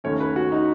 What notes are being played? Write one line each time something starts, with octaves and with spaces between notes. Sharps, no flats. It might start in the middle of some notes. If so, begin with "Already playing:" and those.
D#2 D#3 A3 C#4 C#5
B4
F#4
D#4